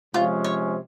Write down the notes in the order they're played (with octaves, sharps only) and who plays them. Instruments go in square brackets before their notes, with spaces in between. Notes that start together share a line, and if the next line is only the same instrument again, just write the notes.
[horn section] C3 F3 G#3 C#4 [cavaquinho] F4
[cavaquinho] C#5